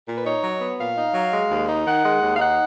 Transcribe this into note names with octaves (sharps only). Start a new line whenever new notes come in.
A#2
B4
D#4 C#5
F#3
B3
A#2 F5
D#4
F#3
G#3
D#2
D#4
D#3 F#5
G#3
D#2
F5
D#4 F#5